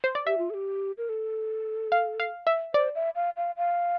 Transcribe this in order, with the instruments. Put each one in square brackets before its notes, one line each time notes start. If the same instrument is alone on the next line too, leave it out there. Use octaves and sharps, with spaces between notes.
[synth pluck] C5
D5
[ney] G4 [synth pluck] E5
[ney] F4
A4
G4
A#4
A4
[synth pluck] F5
F5
E5
[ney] C5 [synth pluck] D5
[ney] E5
F5
F5
F5